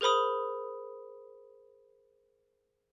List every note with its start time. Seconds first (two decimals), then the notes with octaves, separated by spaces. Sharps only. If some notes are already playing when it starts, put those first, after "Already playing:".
0.01 G#4 A#4 C5 B5 D#6